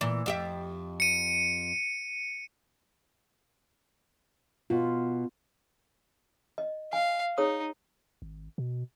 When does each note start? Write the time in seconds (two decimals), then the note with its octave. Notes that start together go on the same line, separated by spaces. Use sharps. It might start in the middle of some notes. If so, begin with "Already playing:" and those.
0.01 A#2 E3
0.26 F2 G4 E5
1.00 C#7 D#7
4.70 B2 F4
6.58 D#5
6.93 F5 G#5
7.38 D#4 G#4 C#5 D#6
8.22 G#1
8.58 B2